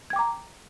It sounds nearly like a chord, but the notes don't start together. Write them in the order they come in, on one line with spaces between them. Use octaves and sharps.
G#6 G5 D6 A#5